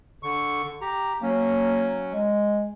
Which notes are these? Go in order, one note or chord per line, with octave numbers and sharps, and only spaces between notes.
D3 C#6
G4 A#5
F#3 A#3 C#4
G#3